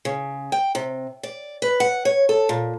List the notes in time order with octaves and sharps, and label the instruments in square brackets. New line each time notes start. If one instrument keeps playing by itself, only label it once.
[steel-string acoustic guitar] C#3
G5
C3
D5
B4
F#5
C#5
A4
A#2